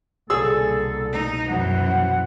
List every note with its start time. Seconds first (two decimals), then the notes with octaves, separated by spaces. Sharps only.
0.30 C2 B2 D3 A#3 G#4 A4 E6
1.12 D#4
1.49 F#2 E3 F#4 C5 F#5